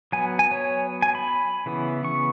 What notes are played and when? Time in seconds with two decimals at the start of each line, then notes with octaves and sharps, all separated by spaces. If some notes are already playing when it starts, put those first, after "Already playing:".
0.12 F#3 B3 G#5
0.39 G#5
0.51 C#5
1.02 G#5
1.15 B5
1.66 C#3 E3 B3
2.04 C#6